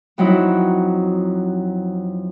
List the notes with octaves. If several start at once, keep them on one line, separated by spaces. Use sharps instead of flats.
F2 F#3 D#4 E4